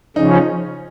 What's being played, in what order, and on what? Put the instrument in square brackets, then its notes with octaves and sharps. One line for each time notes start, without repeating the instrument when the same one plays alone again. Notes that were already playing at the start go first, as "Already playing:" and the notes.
[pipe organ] C#3 F3 C#4 [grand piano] D#4